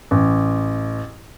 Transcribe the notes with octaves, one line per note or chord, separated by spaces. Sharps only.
A1